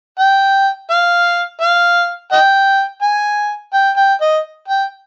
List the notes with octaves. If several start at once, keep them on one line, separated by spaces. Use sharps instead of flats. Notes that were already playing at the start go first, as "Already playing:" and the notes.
G5
F5
F5
D#5 G5
G#5
G5
G5
D#5
G5